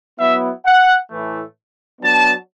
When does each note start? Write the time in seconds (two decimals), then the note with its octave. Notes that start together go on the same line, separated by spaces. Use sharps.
0.18 F#3 B3 E4 E5
0.65 F#5
1.10 A2 E3 A3
2.01 F#3 B3 D4 A5